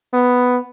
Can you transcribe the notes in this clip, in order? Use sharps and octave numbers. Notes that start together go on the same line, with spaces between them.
B3